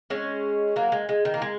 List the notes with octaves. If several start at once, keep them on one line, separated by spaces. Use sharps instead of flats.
G#3 C#4
F#3 A#3
G#3
G#3
D#3
A#3
G#3